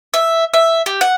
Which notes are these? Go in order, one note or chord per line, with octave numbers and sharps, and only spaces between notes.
E5
E5
G4
F#5